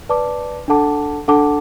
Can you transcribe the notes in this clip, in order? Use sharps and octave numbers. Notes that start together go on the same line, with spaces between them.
B4 D5 A5 D6
D4 A4 F#5 A5 D6
D4 A4 F#5 A5 D6